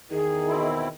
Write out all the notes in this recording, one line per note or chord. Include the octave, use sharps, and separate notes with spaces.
E2 D#3 G#4
B2 C4 E4